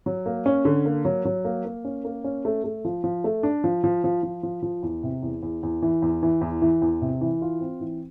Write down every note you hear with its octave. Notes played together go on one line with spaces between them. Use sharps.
F#3
A#3
C#4
D3
A#3
F#3
F#3
A#3
A#3
C#4
A#3
C#4
A3
A3
F3
F3
A3
D4
F3
F3
F3
F3
F3
F3
E2
C3
E2
E2
E2
E3
E2
E3
E2
E3
E2
C3
E3
F4
C4
E3